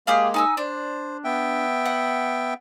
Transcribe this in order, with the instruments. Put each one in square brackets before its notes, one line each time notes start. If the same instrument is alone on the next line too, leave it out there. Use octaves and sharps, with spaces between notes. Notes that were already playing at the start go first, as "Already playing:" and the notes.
[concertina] G#3 A#3 [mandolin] G4 G#4 F5
[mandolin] D#4 G#5 E6
[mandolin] D4 [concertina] C5
[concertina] B3 E5 G5
[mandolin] F#5